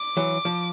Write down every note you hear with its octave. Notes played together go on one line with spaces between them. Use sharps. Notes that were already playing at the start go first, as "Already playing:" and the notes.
Already playing: D6
E3 F#3
F3